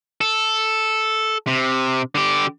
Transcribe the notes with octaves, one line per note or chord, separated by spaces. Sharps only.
A4
C3
D3 G4